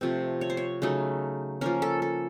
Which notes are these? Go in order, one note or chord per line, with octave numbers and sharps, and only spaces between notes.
C3 F3 A3 C4
C#5
C5
C#5
C#3 F#3 A3 D#4
F3 A#3 C#4 A#4
A4
A4